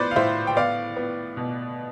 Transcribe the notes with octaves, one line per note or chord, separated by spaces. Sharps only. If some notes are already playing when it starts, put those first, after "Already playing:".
Already playing: A2 B3 B4 C5 D5
F5
A2 C5 E5
G5
B3 D5 F5
B3
B2